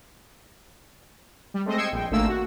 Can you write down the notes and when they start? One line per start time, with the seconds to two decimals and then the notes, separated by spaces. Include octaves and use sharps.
1.54 G3
1.65 G#3 A3 C4 C5 D#5
1.77 D#5 G5 E6 G#6 C7 C#7
1.92 A#1 G5
2.11 G#1 A#2 D3 A3 A#3 E6
2.28 F#4